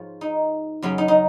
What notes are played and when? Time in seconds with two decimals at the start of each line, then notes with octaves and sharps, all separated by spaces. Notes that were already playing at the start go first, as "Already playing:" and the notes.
Already playing: G#2 F3 F4 C#5
0.21 D#4
0.82 F#2 C#3 F#3 C#4
0.98 D#4
1.08 D#4